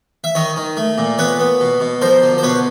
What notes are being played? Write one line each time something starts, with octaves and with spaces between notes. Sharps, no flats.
E5
D#3 C#5 D#5
D#3
A3
A#2
B3 B4 C#5
B3
B2
B2
F3 A#4 C5
D3
C5
B2 B4 C#5